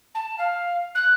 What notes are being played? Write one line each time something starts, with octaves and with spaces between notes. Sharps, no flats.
A5
F5
F#6